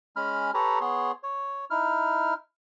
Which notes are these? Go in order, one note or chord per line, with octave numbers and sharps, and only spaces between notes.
G#3 C#4 B5 F6
G4 A4 B4 C#5 A#5
B3 G#4 C#5 C6
C#5
D#4 E4 F6